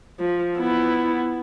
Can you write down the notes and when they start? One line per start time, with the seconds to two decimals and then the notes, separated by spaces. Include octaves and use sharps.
0.20 F3
0.58 B3 E4